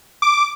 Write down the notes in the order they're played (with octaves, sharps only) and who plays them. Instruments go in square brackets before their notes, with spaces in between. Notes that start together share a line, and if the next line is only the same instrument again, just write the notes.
[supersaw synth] D6